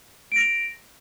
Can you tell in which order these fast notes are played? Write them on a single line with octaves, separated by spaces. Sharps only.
D7 A#6 F7